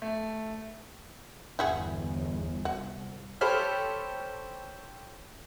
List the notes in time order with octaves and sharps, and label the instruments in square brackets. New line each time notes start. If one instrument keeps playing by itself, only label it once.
[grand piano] A3
[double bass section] G1 E2 [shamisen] E4 F#4 G#4
[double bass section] C2 [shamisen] F#4
[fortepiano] G4 A4 C5 C#5 B5 F6